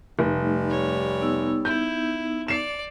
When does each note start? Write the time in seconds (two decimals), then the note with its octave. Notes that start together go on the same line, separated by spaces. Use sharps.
0.19 F1 G3 A3 D#4
0.70 C#5
1.21 B3 D#4 E6
1.65 E4 G6
2.48 D5 C7 E7